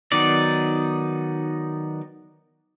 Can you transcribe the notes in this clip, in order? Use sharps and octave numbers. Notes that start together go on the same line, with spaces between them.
D#3 F#3 B3 D#4 D5